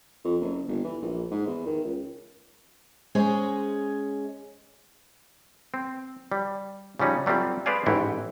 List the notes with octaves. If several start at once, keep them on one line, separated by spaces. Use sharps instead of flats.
F2
F#1
G1
E3
A#1
G#2
E2
D#3
C#2
G#3 C#4 G#4 C5 C#5 D#5
C4
G3
C#3 F3 G3 C#4 D#4
F#3 G3 A3 C4 F4
G#4 B4 C5 D5 F5 G#5
A1 G#2 E4 F#4 G5